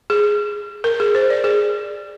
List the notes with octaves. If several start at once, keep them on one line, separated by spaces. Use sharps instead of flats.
G#4
A#4
G#4
C5
D5
G#4